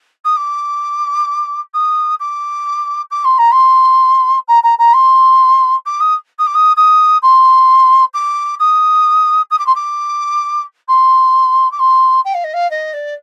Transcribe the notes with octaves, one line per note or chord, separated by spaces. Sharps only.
D#6
D6
D#6
D6
D6
C6
A#5
C6
A#5
A#5
A#5
C6
D6
D#6
D#6
D6
D#6
D#6
C6
D6
D#6
D#6
D6
C6
D6
C6
D6
C6
G5
F5
D#5
F5
D#5
D5